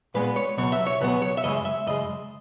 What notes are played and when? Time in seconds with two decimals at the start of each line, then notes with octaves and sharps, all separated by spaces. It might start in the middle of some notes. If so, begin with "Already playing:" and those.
0.14 A#2 G#3 B3 B4
0.36 C#5
0.57 C#2 B2 F#3 B3 C#5
0.72 E5
0.86 C#5
1.01 C#2 B2 F#3 B3 B4
1.22 C#5
1.37 E5
1.44 F#2 C#3 G#3 D#5
1.65 E5
1.87 F#2 C#3 G#3 D#5